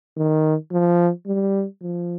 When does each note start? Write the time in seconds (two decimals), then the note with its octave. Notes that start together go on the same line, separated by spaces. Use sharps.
0.17 D#3
0.72 F3
1.26 G3
1.82 F3